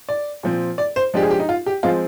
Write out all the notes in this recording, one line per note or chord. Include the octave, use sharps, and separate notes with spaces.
D5
A#2 F3 C4
D5
C5
F3 G#3 D4 G4
G#4
G4
D#4
F4
G4
F3 G#3 C4 F4